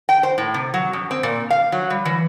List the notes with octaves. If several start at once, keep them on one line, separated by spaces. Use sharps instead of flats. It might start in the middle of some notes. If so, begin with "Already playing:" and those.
G5
C5
A2
C3
F#3
F#2
C4
A#2
F5
F#3
G3
E3